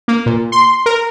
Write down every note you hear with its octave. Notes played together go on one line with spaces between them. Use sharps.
A#3
A#2
C6
A#4